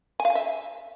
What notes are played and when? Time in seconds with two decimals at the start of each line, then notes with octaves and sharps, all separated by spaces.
0.20 G#5
0.25 F5
0.30 G#5
0.35 E5